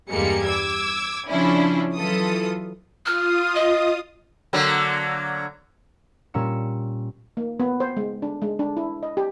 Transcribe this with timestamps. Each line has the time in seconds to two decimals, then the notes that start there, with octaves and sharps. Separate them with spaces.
0.10 E2 G2 G3 G#3 A#3 C#7
0.45 D6 E6 G#6
1.27 C#3 F3 C#4 D4 E4
1.96 E3 F#3 F4 A4 D#6
3.06 F4 D#6 F6
3.55 D#5
4.53 D3 F#3 A#3
6.34 A#2 G3 C#4 A#5 E6 C#7
7.37 A#3
7.60 B3
7.80 C5
7.97 G#3
8.22 D4
8.42 G#3
8.59 D4
8.77 E4
9.03 D#5
9.17 G4